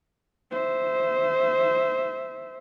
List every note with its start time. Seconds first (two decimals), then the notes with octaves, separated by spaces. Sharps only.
0.51 C5 E5